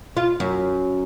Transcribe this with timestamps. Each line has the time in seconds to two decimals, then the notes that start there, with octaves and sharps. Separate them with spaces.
0.17 F4
0.40 F#2